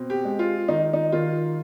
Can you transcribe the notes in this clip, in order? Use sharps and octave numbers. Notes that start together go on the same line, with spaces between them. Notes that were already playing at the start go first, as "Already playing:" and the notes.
Already playing: B2 C4
G4
G#3
F4
D#3 D#4
D#4
D#3 F4